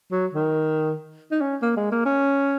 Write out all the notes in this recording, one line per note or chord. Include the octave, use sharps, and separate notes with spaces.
F#3
D#3
D#4
C#4
A#3
G#3
A#3
C#4